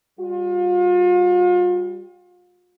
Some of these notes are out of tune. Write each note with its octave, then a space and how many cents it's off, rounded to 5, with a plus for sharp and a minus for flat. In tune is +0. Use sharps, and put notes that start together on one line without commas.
G3 +0 F4 +40